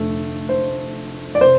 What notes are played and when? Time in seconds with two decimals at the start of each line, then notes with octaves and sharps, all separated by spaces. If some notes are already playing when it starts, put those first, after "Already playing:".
Already playing: F1 F2 D3 A3
0.49 C5
1.35 D5
1.41 C3 C5